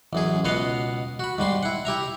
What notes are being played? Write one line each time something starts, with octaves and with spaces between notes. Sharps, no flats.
A1 F#2 G#4
C#2 B2 B3 D#5 F5 F#5
F#4 B5
G#2 G3 B5 C6
E4 F#5
E4 G4 E5 A#5